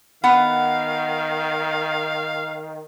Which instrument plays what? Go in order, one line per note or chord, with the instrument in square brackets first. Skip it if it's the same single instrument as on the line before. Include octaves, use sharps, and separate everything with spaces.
[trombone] D#3 [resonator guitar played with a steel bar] B3 F#5 [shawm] F5